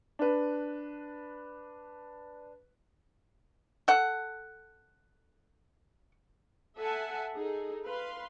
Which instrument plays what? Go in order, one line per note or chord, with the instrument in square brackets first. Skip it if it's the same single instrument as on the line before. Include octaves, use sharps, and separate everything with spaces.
[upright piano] D4 B4
[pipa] A4 F#5
[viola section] A4 E5 F#5 G#5 A5
D#4 G#4 A4
B4 F5 C6